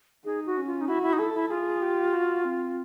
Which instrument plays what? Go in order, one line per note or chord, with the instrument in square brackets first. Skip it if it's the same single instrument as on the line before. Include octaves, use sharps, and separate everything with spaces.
[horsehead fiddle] D#4 [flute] G#4
[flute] F#4
[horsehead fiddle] C#4
[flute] F4
D#4
[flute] E4 [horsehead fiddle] F#4
[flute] E4
D#4
[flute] E4 [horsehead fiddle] A4
[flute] E4
[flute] F4 [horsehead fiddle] G#4
[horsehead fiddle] G4
F#4
C4